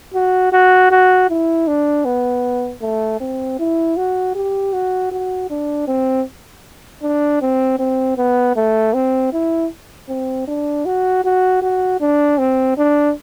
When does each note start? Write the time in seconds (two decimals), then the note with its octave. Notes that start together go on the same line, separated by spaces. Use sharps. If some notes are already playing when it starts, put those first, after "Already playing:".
0.14 F#4
0.52 F#4
0.91 F#4
1.30 E4
1.68 D4
2.05 B3
2.82 A3
3.20 C4
3.59 E4
3.97 F#4
4.35 G4
4.73 F#4
5.12 F#4
5.50 D4
5.88 C4
7.03 D4
7.42 C4
7.79 C4
8.18 B3
8.56 A3
8.94 C4
9.33 E4
10.09 C4
10.48 D4
10.85 F#4
11.25 F#4
11.62 F#4
12.01 D4
12.39 C4
12.78 D4